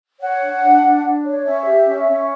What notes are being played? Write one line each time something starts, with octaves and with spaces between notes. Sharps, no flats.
C#5 F#5
D4
D4
D4
D4
C#5
C#4 E5
G4
C#4
C#4